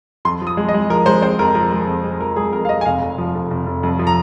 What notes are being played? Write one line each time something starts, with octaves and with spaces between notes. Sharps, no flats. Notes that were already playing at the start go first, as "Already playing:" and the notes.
F2 C6
F3
D#6
G#3
D#5
G#3
F3 A#4
G#3 C5
C4 C5
F2 A#4
F3 A#4
G#3
F2
G#3
F3 A#4
G#3 G#4
F2 A#4
F5
F2 D#5
G#5
F1 F5
F1
F3
F1
F1
F1
F2
F3
A#5